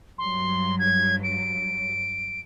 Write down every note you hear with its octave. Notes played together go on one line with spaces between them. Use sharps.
G2 F#3 C6
G#6
D7